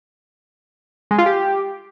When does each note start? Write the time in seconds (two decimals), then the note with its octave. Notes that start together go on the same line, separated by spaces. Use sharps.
1.11 G#3
1.18 F4
1.26 G4